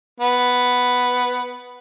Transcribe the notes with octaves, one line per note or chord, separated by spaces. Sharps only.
B3